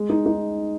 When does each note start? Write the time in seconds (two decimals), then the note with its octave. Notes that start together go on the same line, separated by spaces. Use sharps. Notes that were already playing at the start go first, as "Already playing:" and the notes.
Already playing: G#3
0.10 D#4
0.26 D#4